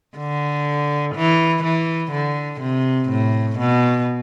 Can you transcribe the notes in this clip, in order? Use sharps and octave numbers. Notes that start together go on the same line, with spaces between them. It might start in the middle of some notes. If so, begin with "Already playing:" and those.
D3
E3
E3
D3
C3
A2
B2